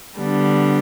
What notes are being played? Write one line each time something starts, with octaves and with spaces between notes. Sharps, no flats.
D3 G3 B3 D4